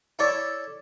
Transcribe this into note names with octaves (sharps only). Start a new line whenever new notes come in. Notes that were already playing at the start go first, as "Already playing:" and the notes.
E4 A4 C#5 D5 E5